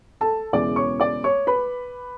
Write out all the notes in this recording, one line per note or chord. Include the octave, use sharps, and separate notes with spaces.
A4 A5
E1 E2 C#3 E3 D5 D6
C#5 C#6
D5 D6
C#5 C#6
B4 B5